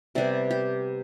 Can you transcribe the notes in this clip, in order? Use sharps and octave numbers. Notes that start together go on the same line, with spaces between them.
C3 G3 B3 D5
G4